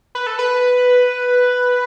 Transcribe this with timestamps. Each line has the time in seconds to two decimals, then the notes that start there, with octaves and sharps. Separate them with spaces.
0.15 B4
0.27 A4
0.39 B4